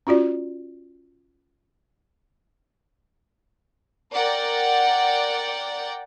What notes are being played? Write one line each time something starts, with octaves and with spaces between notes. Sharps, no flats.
C#4 F4 F#4 D5
A#4 D5 F#5 G5